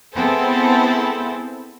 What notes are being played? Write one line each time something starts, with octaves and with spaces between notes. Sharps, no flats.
B3 C4 E4 G#4 A4 C5